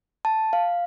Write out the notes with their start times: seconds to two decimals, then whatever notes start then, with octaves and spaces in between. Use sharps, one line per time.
0.25 A5
0.53 F5